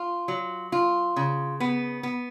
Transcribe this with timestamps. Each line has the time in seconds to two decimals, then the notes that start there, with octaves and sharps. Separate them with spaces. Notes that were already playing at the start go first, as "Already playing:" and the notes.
Already playing: F4
0.28 F#3
0.72 F4
1.16 C#3
1.60 B3
2.03 B3